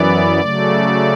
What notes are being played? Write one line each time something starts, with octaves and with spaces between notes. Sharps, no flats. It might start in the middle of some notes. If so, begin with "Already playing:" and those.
Already playing: F#2 E3 B3 D5
C#3 F#3 A3